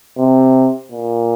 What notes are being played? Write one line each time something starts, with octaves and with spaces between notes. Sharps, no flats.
C3
A#2